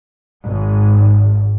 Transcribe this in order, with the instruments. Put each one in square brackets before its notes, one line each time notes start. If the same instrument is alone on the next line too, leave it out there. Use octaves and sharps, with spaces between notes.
[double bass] G#1 G#2